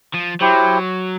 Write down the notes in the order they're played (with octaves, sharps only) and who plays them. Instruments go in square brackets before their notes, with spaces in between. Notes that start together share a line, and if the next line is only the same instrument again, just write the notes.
[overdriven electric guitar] F3
[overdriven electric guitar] F#3 [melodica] E4 G4 C5